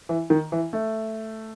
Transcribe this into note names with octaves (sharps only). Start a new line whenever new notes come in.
E3
D#3
E3
A3